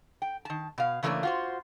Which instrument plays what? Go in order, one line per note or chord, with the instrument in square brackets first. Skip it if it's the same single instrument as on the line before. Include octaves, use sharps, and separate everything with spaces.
[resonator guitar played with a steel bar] G5
D#3 A5
B2 F5
C#3 E3 A3 A#3 C#4 D4
F4 F#4 C5